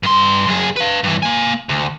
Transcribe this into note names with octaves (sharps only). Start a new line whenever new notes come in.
G2 C6
F#2 G#4
B4 F5
G2 E3
A#3 G#5
D2